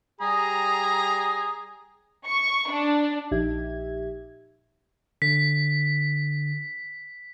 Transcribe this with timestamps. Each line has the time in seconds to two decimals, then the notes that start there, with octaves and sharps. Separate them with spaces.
0.21 G3 G#4 A#5
2.26 C#6
2.69 D4
3.31 A#1 D#4 G4 E5 G#6
5.22 D3 B6